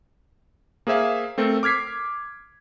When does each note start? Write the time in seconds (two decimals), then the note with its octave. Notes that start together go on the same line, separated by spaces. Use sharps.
0.87 A#3 G#4 C5 E5 F5
1.38 A3 C4 A4 A#4
1.63 D6 F6 G#6 B6 C7